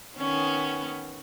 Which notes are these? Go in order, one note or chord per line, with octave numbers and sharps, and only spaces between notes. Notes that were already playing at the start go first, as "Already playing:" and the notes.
D#3 B3 C#4